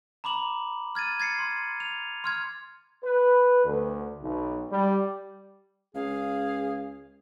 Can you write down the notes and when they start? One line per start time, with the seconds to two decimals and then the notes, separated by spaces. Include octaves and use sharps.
0.24 A#5 B5 D6 F#7
0.95 F6 G#6 A6 D#7
1.20 G#6 A6 C7 C#7
1.39 C6
1.80 F7
2.24 C6 F6 G#6
3.04 B4
3.64 D2
4.21 B1
4.70 G3
5.95 C#2 G#4 F5